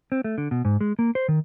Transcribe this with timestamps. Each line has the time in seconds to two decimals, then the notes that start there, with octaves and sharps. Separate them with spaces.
0.12 C4
0.24 A3
0.38 D3
0.51 B2
0.65 G#2
0.81 G#3
0.99 A#3
1.15 C5
1.28 D#3